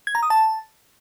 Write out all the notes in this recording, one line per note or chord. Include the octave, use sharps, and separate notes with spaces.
G#6
A#5
D#6
A5